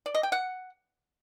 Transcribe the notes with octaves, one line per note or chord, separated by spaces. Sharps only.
D5
D#5
G5
F#5